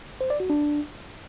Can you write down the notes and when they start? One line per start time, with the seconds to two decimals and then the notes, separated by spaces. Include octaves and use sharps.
0.21 C5
0.30 D5
0.40 F#4
0.50 D4